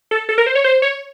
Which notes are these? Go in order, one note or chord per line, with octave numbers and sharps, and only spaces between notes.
A4
A4
A#4
C5
C#5
C5
C#5